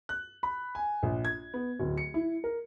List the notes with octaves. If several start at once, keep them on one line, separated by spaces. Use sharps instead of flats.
F#6
B5
G#5
A#1
G#6
B3
D1
C#7
E4
A#4